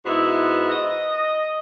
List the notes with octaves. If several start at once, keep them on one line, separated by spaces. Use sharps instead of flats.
G#2 B3 E4 F#4
D#5